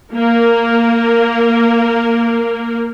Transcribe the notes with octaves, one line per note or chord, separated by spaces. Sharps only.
A#3 A#4